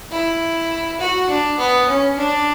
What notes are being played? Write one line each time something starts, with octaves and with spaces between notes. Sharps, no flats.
E4
F#4
D4
B3
C#4
D4